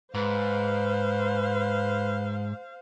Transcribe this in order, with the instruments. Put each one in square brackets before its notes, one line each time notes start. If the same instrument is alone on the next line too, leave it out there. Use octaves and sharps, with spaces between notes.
[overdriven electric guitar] G#2 [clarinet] B4 [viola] C5 F5